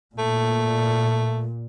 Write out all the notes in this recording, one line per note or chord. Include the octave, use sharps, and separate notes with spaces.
A#2 A3